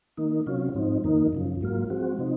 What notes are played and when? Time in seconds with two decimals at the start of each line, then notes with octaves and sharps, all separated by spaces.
0.17 D#3 A#3 D#4
0.46 C3 F#3 C#4 F4
0.75 G#2 F3 C4 D#4
1.04 F2 D#3 A#3 D#4
1.33 F#2 C#3 F3
1.61 G#2 F#3 A#3 F4
1.90 F3 G#3 C4 F#4
2.19 C3 F3 C4 D#4